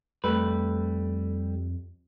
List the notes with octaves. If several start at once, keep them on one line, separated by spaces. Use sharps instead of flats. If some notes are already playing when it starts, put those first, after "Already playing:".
F2 G3 A3 B4